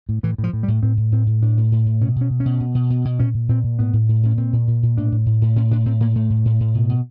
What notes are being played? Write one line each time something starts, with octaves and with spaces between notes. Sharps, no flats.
A2
A2 E3
A2
F3
A2
G3
A2
A2 C4
A2
A2 C4
A2
A2 D4
A2
A2
A2
B2 C#4
B2
C#4
B2
C#4
B2
B2
B2
B2
B2
A#2 C#4
A#2
A#2 C4
A#2
A2 B3
A2
A2
A2 C#4
A#2 C4
A#2
A#2
A#2
A2 D4
A2
A2
A2
A2 C#4
A2 D4
A2 C4
A2 A#3
A2 A3
A2
A2
A2
B2
B2